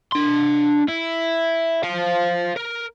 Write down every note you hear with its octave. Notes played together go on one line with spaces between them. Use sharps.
D4 C6
E4
C5 F5
A#4